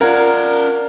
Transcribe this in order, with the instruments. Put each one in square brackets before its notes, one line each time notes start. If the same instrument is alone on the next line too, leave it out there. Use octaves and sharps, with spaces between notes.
[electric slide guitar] C#4 D5 [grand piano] F4 F#5 G#6 [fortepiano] A#4